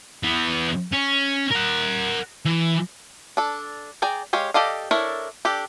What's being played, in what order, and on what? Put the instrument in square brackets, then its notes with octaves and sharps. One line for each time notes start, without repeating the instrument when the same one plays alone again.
[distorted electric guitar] E3 B3
C#4
A#4 F#5
E3
[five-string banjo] D4 A4
G#4 D5 G5 A#5
G#3 G4 C#5 F5
G4 A4 D5 D#5 F5
D4 E4 A4 A#4 C#5
D4 G4 A4